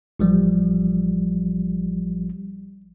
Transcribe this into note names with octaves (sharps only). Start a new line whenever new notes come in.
A1 F3 G3